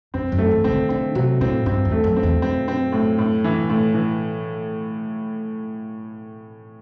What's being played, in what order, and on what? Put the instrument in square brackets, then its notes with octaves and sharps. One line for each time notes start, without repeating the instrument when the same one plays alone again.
[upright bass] F#2 [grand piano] C4
[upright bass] F#2
[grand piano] A3
[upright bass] E3
[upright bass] C3 [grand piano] C4
[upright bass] D3
[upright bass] D3 [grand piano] C4
[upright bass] C3 [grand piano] F#3
[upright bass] A2 [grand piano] C4
[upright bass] G2 [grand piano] C4
[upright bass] E2
[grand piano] A3
[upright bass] F#2
[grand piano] C4
[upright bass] E2
[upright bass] F#2 [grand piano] C4
[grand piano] C4
A2
A2
E3
A2
E3